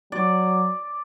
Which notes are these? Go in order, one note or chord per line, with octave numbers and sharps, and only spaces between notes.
F#3 D5